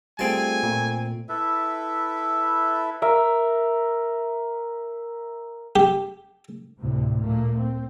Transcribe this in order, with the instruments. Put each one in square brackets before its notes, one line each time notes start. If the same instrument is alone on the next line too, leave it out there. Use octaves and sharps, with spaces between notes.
[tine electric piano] G3 F4 G#4 [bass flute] A3 [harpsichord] C4 A5 [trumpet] G#5
[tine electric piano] A#2
[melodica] E4 A4 B4 E5
[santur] A#4 E5
[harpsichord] G4
[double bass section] D2 A2 C3
A#2 A3 A#3
C4